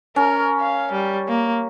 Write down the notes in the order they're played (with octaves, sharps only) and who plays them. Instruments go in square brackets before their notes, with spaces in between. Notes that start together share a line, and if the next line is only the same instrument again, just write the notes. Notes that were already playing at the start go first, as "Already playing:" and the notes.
[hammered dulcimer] C#4 [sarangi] A#4
[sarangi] F5
G3
A#3